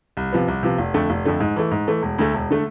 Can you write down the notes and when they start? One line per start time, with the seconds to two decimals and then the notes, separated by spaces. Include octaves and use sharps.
0.17 C2
0.32 C3 F3 B3
0.48 C2
0.63 C3 F3 B3
0.78 F1
0.94 F2 D3 A3
1.10 F1
1.25 F2 D3 A3
1.40 G#2
1.56 E3 A3
1.71 G#2
1.87 E3 A3
2.02 E1
2.18 D2 D3 A3
2.34 E1
2.50 D3 A3